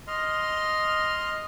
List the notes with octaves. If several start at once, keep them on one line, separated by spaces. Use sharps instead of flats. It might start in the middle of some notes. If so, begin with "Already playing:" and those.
D#5 C6 F6